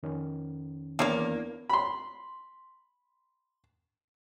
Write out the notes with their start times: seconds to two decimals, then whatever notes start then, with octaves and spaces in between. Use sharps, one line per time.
0.03 F2 D#3 C#4
0.99 E2 A#3 D4 C#5 D5
1.70 B5 C6